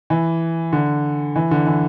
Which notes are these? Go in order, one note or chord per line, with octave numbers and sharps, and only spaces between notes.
E3
D3
E3
D3
E3